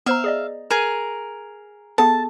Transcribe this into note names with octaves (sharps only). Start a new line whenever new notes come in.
B3 C5 E5 F5 A#5
G#4 D5 D#5
G#4 A#4 D#7
B3 G#4 A4 A5